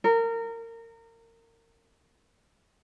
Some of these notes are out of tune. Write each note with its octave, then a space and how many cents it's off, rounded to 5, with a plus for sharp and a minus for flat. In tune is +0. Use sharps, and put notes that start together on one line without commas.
A#4 -25